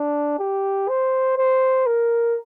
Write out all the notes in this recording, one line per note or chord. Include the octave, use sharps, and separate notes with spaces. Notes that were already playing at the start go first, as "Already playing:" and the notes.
Already playing: D4
G4
C5
C5
A#4